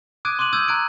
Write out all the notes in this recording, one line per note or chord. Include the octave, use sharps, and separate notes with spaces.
D6 D#6 F#6 G#6 D7 D#7
C6 D6 F#6 D#7 F#7
D#6 E6 G6 G#6 D#7
A#5 F#6 G#6 D7